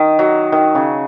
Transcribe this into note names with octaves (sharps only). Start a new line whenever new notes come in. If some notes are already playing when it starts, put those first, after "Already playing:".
Already playing: D#3
F#3
D#3
C#3